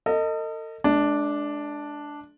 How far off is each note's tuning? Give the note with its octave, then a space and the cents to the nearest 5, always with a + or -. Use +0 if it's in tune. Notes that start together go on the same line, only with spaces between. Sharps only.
A4 +45 D#5 +0
G#3 +45 D4 +0